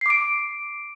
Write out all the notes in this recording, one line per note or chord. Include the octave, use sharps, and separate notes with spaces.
D6 C7 D7